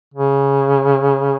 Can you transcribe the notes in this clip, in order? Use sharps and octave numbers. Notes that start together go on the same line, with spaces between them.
C#3